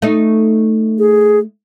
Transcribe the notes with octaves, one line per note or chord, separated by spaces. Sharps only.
A3 D#4
G#4